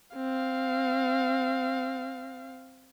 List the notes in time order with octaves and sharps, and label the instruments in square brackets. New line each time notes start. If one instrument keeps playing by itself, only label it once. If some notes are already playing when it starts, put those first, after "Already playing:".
[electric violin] C4 F5